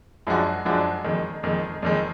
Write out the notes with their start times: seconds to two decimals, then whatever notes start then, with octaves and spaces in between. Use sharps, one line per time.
0.27 F#2 F3 G#3 D4 F#4
0.65 F#2 F3 G#3 D4 F#4
1.04 F2 D#3 G#3
1.43 F2 D#3 G#3
1.82 F2 D#3 G#3